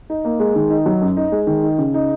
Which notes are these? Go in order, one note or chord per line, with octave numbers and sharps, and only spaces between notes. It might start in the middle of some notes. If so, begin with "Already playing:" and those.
D#4
A#3
G#3
D#3
D#4
F#3
F#2
D#4
G#3
D#3
D#4
C#3
D#4